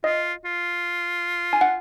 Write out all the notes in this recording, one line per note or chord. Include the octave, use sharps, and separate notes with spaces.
F4 D#5
F4
G#5
F#5